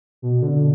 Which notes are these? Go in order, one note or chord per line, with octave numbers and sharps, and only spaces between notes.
B2
D3